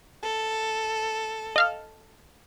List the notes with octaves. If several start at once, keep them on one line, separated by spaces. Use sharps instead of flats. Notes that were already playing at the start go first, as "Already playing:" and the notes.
A4
D#5 F5 F6